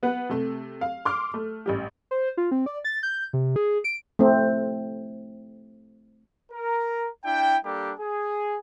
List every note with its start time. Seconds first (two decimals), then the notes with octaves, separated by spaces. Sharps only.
0.03 B3 B4 F#5
0.29 C3 A3
0.81 F5
1.05 C6 D6 F6
1.34 A3
1.66 A1 G3 G4
2.11 C5
2.37 F4
2.51 C4
2.66 D5
2.85 A6
3.03 G6
3.33 C3
3.56 G#4
3.84 D7
4.19 A3 C4
6.52 A#4
7.25 D4 E4 G5
7.65 G3 A#3 D4 G4 A4
8.00 G#4